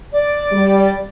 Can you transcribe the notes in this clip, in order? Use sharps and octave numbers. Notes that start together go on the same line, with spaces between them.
D5
G3